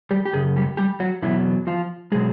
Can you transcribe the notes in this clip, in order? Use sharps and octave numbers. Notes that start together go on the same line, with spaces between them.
G3 G4
G4
F#2 C#3 G#4
G3 G4
G3 G4
F#3 F#4
E2 B2 E3 F#3 E4
F3 F4
B2 F#3 G#3 G#4